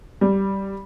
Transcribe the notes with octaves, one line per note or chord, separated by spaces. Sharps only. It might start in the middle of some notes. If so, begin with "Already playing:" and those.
G3